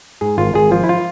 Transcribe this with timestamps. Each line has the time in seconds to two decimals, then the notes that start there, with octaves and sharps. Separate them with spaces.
0.21 G#2 G#4
0.38 G#1 F4
0.55 G#1 G#4
0.71 F3 F4
0.83 E4
0.89 F4